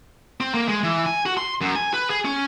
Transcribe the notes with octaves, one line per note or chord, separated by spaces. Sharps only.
C4
A#3
G#3
E3
G#5
F#4
C6
F#2
G#5
B4
G#4
C#4